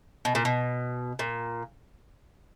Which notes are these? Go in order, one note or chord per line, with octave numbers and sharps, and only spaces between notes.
B2
A#2
B2
A#2